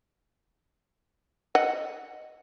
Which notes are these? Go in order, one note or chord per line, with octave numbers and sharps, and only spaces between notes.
D#5 F#5